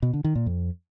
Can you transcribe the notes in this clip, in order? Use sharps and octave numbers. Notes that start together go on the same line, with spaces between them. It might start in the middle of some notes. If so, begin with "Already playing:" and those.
B2
D3
D#3
A#2
F2